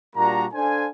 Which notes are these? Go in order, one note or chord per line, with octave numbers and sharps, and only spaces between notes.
A#2 G3 A#3 D4 F#4 A#5
D4 A4 C5 F5 G#5